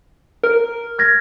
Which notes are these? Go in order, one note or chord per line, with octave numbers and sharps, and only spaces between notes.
A#4
F6 G#6 A#6